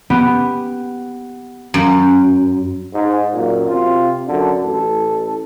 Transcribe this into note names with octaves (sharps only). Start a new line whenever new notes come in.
B3 G4
F#2
G#2
F#2 A#2
C3 F4
F#2 D3
A1 A4